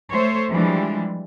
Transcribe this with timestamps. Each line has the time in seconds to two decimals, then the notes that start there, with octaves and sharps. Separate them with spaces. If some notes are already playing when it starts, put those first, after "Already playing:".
0.12 A3 C5 C#5
0.50 E3 F3 G3 G#3 D4